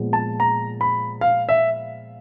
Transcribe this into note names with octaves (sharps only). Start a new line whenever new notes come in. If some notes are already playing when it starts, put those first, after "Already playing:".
Already playing: A#2 F3 G#3 B3
A5
A#5
B5
F5
E5